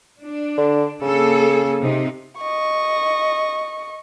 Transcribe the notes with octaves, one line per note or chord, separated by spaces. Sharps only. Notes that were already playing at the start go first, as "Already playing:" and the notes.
D4
D3
C#3 A#3 G#4 A4
C3 D#4
D#5 C#6